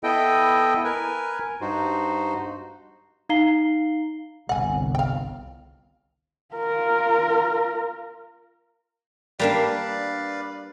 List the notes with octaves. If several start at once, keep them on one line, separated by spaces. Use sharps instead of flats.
B3 E4 A4 D#5 G5
A#4 B4 G#5
G2 D#4 F#4 C5
D#4 F5 A#5 C7 G7
G1 C2 F#5 G#5
F5 G5
F4 A#4
G3 A#3 D4 B4 D5 F5